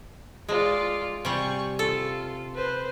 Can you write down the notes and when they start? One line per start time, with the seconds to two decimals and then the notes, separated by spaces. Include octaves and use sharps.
0.49 G#3 F4 D5
1.25 C3 G3 G#5 C#6
1.79 F4 A4
2.54 B4 C5